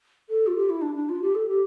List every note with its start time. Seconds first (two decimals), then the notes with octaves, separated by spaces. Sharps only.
0.29 A4
0.47 F4
0.56 G4
0.70 E4
0.82 D4
0.96 D4
1.09 F4
1.22 G4
1.35 A4
1.48 G4